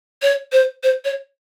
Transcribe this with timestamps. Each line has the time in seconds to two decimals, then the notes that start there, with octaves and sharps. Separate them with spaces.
0.22 C#5
0.52 C5
0.83 C5
1.05 C#5